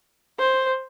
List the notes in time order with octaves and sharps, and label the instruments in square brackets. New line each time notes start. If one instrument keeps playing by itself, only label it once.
[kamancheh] C5